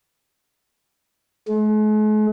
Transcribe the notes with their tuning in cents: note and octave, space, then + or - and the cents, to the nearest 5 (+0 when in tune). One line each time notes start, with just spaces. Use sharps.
G#3 +45